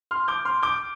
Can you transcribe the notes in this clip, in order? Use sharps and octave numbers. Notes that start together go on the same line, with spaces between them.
C6 F6
D6 G6
C6 F6
D6 G6